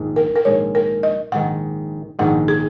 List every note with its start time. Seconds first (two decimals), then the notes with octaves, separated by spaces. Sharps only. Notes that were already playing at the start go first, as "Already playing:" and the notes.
Already playing: A#1 G#2 D#3 G#3
0.16 A#4
0.36 A#4
0.45 A#1 G#2 D#3 G#3 C#5
0.75 A#4
1.03 D#5
1.32 A#1 G#2 D#3 G#3 F#5
2.19 A#1 G#2 D#3 G#3 F#5
2.48 G#4